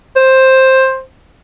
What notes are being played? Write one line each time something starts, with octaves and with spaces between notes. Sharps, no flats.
C5